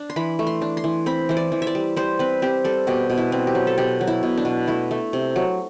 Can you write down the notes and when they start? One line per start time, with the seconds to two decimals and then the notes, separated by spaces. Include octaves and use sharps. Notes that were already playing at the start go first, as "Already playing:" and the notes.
Already playing: D4
0.10 C6
0.16 E3 B5
0.39 A3
0.47 C6
0.62 D4
0.77 C6
0.84 E3
1.06 C4 B5
1.29 E3 C5
1.37 D5
1.52 E3
1.62 E5
1.67 D5
1.75 G3
1.97 G3 C5
2.19 C4 B4
2.42 C4 G4
2.64 G3 A4
2.87 B2 G4
3.10 B2
3.17 E4
3.32 C4
3.47 G4
3.55 F#3
3.67 A4
3.78 B2 G4
4.01 F#3
4.07 E4
4.23 B2
4.37 D4
4.45 B2
4.67 A3 E4
4.91 A3
5.13 C3
5.36 F#3